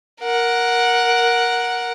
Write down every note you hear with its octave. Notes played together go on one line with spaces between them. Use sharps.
A#4 F#5